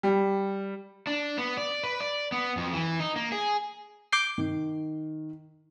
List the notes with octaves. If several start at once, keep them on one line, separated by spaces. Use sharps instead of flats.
G3
D4
B3
D5
B4
D5
B3
F2
E3
D#4
A#3
G#4
D6 G6 C7
D#3